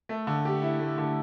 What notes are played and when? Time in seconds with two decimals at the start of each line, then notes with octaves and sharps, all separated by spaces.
0.09 A3
0.27 D3
0.45 G4
0.62 E4
0.80 A3
0.98 D3